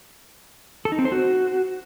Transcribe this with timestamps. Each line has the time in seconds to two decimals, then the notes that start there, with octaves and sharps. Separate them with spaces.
0.85 A4
0.92 D#4
0.99 C4
1.05 C5
1.12 F#4